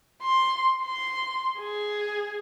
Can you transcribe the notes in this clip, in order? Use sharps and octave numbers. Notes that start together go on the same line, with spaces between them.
C6
C6
G#4